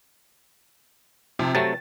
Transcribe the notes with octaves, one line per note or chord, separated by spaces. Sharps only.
C3 F3
C3 F#3 A3 A6